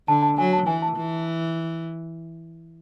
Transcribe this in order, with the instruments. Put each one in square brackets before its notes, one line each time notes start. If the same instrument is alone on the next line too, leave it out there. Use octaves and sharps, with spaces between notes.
[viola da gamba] D3 [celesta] A5
[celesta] A5
[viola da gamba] F#3 [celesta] G#5
[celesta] A5
[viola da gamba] E3 [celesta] G#5
[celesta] A5
[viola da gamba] E3